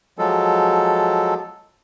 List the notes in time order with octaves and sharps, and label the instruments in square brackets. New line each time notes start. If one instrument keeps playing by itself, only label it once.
[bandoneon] F3 F#3 G#3 A4